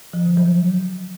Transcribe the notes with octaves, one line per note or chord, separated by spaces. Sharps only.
F3
D3
F#3